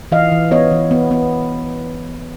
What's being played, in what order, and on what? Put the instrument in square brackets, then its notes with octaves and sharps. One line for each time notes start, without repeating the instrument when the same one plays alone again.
[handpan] E3 D#5 F5
E3
B3 C#5 D#5
E3
B3
B3